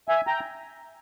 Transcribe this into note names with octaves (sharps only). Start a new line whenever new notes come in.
E5 G#5
G5 A#5